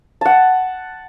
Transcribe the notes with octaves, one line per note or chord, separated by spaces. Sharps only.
F#5 A5